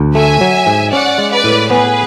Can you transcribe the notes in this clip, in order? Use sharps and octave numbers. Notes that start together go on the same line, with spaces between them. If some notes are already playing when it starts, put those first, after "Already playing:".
Already playing: D2
A3 E5 G#5
F#3
G#2
C#4 D5 F#5
G#3
B4 D5
A2
B3 G#4 B4